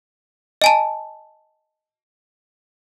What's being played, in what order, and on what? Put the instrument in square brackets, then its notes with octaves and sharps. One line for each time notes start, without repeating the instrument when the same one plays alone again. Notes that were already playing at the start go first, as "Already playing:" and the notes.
[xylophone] D#5 G#5 A5